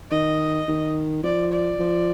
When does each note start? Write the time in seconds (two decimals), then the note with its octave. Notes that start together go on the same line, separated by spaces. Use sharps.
0.11 D#3 D#5
0.68 D#3
1.23 F3 D5
1.52 D5
1.79 F3